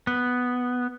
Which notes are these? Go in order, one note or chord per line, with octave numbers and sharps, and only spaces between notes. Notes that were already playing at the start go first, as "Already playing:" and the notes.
B3